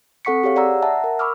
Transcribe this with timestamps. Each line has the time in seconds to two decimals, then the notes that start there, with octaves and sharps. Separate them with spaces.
0.25 C4 A4 F#5 C#6 B6 C#7
0.43 G4 G#4 C#5 F5
0.56 D5 F#5 A#5 E6
0.83 E5 F#5 A5 A#5
1.04 A#4
1.19 B5 C#6 D6 E6 F6